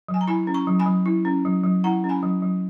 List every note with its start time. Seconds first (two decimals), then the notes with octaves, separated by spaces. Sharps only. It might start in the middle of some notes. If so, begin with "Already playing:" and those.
0.08 F#3
0.14 G#5
0.21 A#5
0.27 E4 G#5 B5
0.47 C#4
0.54 A#5 C#6
0.67 F#3
0.79 G#5 B5
0.86 F#3
1.06 E4
1.25 C#4
1.45 F#3
1.64 F#3
1.84 E4 F#5 A#5
2.04 C#4
2.09 G#5 B5
2.23 F#3
2.42 F#3